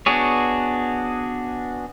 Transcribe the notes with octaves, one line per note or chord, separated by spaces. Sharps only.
B3 D4 F#4 G#4 C#5